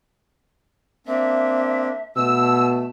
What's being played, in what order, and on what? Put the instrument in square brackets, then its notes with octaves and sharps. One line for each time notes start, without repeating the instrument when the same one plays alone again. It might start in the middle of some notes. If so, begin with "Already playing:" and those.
[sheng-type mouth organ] A#3 C4 D4 [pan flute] E5
[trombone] B2 [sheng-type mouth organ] A3 [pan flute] A5 [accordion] E6